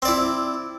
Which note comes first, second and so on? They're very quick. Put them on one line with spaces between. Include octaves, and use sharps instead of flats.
C4 D5 E4